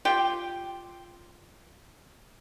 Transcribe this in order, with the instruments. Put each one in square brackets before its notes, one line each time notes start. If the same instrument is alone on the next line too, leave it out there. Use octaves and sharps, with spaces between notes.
[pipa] F4 G4 G5